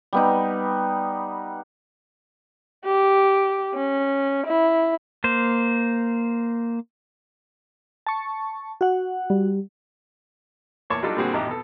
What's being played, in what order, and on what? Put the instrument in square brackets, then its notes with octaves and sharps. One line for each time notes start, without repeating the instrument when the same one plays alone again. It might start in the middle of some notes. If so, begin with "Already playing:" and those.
[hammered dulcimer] G3 B3 D#4
[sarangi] G4
C#4
E4
[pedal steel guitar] A#3 C5
[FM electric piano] A5 C#6
F#4 F#5
[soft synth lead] G3
[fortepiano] E2 A#2 C#5 A5 C#6 D6
F#3 G3 D4 D#4 F4 A4
A#2 D3 G3 C4 F#4 G#4
A1 F2 D#4 G4 E5 A#5
B2 A4